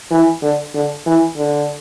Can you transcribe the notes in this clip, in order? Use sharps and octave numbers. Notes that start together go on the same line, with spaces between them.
E3
D3
D3
E3
D3